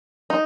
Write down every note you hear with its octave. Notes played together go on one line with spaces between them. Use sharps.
D#4